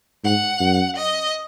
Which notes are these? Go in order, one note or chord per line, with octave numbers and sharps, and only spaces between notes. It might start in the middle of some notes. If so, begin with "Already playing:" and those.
G#2 F#5
F#2
D#5